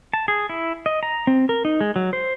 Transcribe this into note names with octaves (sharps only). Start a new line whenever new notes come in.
A5
G#4
E4
D#5
A#5
C4
A#4
D#4
G#3
F#3
C5